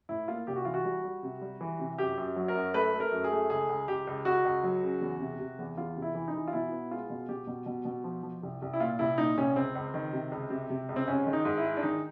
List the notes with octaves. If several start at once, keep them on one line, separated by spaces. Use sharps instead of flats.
A2 E4
A#3 F4
C2 G4
F#4
E3 F4
F#4
G3
G3
C3
G3
E3
C3
F#2 G4
F#2
F#3
A#4
F#2
A3 B4
A3
A#4
F#2
G#4
A3
C#2 G#4
C#2
C#2 G4
C#2
C#2 F#4
C#2
F#3
C#3
E2
C3
C3
E2
E2 F4
C3
E4
E3
D#4
E3
F4
B2 E4
B3
G#3 F4
B2
B2 G4
B2
B2
B2
F3
F3
C2
C2
E4
A#2 F4
C2 E4
A#2 D#4
C2 C#4
C#2 C4
C#2
D#3
C3
C#2
C3
C3
C#2
C4
G#2 C#4
D#3
D#4
G#2
E4
G#3
D4
D#3 D#4